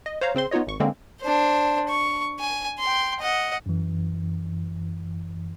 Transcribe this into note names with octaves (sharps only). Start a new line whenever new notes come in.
D#5
C5 C#5 F5 A#5
C#3 C4 C5 C6
B3 D#4 F4 C#5 D#5
G#1 C#6
D3 G#3 A#3 C4 C#4
D4 C5
C#6
G#5
G5 C6
D#5 F#5
F#2 E3